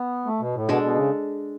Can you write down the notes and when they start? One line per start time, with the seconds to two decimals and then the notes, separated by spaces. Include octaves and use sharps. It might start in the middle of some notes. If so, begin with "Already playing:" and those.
Already playing: B3
0.26 A3
0.40 B2
0.55 A2
0.68 B2 G#3 D4 A4
0.83 B2
0.96 C#3